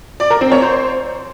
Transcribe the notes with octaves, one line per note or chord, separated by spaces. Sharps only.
D5
A#4
C4
C#5
C5